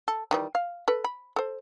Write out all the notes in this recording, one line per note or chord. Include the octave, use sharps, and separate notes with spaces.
A4
D#3 E3 G3
F5
A4 B4
B5
A4 C5